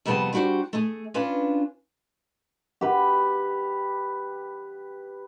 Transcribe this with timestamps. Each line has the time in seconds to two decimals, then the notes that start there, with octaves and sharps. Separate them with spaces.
0.06 F2 C3 G3 B3 G#4 A5
0.33 G3 D4 F#4 G4 C5
0.73 A3 G#4
1.14 C#4 D4 F4 B4
2.81 G4 B4